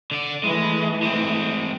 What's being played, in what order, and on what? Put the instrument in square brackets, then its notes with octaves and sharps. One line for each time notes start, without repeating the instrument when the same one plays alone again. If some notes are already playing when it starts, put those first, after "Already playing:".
[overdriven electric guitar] D3 D5
[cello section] E3 A3 [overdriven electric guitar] G#3
[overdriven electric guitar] G#3 C4